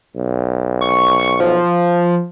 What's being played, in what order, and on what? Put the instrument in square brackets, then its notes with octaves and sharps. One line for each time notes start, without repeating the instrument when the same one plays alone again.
[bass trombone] B1
[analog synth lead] C#6
F3